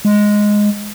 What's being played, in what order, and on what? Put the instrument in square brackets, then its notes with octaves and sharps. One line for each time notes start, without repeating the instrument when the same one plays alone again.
[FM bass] G#3